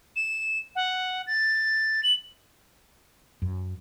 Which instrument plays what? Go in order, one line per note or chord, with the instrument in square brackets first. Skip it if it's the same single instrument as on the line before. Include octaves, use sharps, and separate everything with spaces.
[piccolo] E7
F#5
A6
F#7
[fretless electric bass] F#2